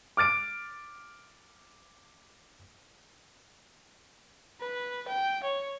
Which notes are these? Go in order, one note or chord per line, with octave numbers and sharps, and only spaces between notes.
D6 F6 A6 D7
B4
G5
C#5